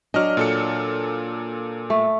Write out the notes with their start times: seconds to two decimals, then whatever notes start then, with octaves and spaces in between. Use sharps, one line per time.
0.14 F#3 D4 D#5 F6
0.37 A#2 A4 C#7
1.90 A3